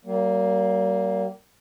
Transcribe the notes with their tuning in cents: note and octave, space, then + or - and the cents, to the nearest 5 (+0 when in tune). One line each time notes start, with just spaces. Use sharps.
G3 -45 A#3 +0